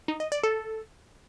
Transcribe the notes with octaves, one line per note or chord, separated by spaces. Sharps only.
D#4
D#5
D5
A4